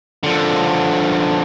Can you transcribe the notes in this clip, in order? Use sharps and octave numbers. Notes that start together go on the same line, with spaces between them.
D3 F3